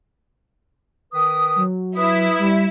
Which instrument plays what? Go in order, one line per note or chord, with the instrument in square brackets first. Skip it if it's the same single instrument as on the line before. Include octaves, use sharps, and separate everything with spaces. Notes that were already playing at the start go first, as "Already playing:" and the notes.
[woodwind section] D#3 B4 D#6
[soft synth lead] F#3
[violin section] E4 [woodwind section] B4 D#6
[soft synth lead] G3